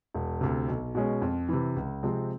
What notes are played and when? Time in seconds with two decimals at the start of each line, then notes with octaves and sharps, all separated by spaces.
0.15 E1
0.41 D2 C3
0.68 B1
0.95 B2 G#3 C#4
1.22 F2
1.49 C3 E3
1.76 C#2
2.03 C3 F3 G#3 C4